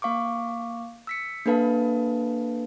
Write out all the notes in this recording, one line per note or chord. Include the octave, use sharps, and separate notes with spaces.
A#3 F5 C#6 D6
E6 B6 C#7
A#3 D4 A4 B4 F5 A5